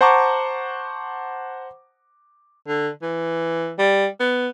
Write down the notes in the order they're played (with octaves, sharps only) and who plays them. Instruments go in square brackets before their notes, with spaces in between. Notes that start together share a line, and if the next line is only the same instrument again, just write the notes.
[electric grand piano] C5 F#5 A5 A#5 C#6 D6
[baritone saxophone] D3
E3
G3
B3